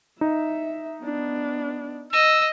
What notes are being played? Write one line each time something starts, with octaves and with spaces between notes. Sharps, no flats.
D#4 E5
B3 D4
D#5 E6